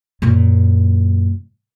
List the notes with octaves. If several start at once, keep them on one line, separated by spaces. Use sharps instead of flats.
F#2 A#2